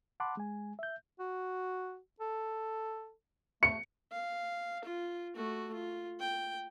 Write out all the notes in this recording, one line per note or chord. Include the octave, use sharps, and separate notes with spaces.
F#5 A5 B5 C6 D6 F#6
G#3 G#5
E5 G6
F#4
A4
A3 C#7
F5
F4
A3 F#4
F4
G5